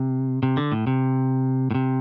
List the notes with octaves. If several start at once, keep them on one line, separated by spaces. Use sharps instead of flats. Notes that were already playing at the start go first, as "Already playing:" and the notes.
Already playing: C3
C3
D3
A2
C3
A2
C3